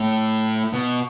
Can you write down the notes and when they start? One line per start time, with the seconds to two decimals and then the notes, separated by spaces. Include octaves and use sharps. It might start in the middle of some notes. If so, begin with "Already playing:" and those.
Already playing: A2
0.73 B2